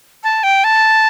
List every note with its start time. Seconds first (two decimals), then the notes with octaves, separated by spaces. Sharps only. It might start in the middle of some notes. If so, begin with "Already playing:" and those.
0.24 A5
0.43 G5
0.64 A5